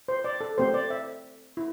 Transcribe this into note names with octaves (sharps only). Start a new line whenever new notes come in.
C5
D5
A4
A3 C4 G4 C5
D5
E5
E4